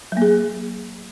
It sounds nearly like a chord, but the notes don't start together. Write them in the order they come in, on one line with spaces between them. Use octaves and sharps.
F#3 A#3 G#4